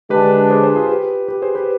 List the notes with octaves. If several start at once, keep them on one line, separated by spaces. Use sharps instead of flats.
D3 G#3 D4 G4 B4
G#4 C5
G#4 C5
F4 G#4
G4 B4
G4 B4
G#4 C5
G4 B4